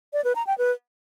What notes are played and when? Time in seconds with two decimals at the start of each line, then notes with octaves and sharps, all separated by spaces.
0.13 D5
0.24 B4
0.36 A#5
0.47 G5
0.58 B4